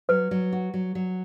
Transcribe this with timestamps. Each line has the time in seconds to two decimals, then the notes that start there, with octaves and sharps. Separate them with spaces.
0.09 F#3 B4
0.31 F#3
0.52 F#4
0.74 F#3
0.95 F#3